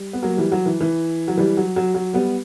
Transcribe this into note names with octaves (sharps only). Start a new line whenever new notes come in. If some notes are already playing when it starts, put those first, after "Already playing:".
Already playing: G3
B3
F#3 A#3
E3 G3
F#3
E3
E3
F#3
E3 G3
F#3
F#3
F#3
G3 B3